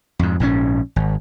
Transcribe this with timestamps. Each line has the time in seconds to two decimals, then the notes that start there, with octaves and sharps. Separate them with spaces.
0.19 F2 G#2
0.40 A#1 G#2 E3 C#4
0.96 G#1